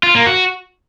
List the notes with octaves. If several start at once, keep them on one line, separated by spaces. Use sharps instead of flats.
F4
A#3
F#4